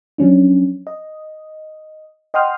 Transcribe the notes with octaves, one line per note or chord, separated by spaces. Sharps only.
F3 F#3 C#4 D4
D#5
D#5 F#5 G5 C6 D#6 F6